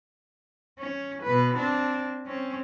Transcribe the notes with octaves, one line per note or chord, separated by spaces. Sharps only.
C#4
B2 B4
C4 D4
C4 C#4